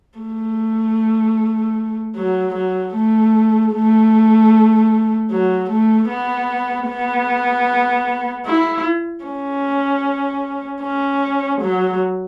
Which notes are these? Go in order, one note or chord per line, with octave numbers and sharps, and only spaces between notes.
A3
F#3
F#3
A3
A3
F#3
A3
B3
B3
E4
C#4
C#4
F#3